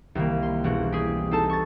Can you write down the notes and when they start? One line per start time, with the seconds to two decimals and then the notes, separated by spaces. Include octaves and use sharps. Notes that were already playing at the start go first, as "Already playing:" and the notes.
0.15 C2 D#3 A#3
0.43 C6
0.64 E1 A#3 F#4
0.92 G4 G#4
1.31 C4 D#4 A4 A5
1.49 C#6 A6